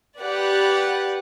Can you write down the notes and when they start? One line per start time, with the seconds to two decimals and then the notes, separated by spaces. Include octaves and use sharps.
0.20 G4 B4 D5 F#5